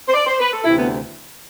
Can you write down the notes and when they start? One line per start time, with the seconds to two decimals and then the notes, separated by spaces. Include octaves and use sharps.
0.08 C5
0.14 D5
0.26 C5
0.40 B4
0.52 A4
0.63 D2 C3 E3 E4
0.77 B3